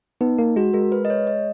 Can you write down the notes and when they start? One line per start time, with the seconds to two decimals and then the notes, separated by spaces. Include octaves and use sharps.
0.21 B3 D#4
0.38 A#3
0.56 G#3 F#4
0.73 G#3 A#4
0.92 B4
1.05 D#5
1.10 C#5
1.27 D#5